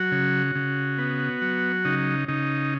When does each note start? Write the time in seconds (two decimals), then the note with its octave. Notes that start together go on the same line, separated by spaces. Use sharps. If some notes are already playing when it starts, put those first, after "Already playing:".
Already playing: F#3 F#4
0.12 C#3
0.55 C#3
0.98 B3
1.42 F#3
1.85 C#3 D#4
2.28 C#3 D#4